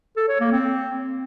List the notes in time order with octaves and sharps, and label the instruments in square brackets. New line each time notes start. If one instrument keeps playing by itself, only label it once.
[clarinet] A4
C#5
A#3
C4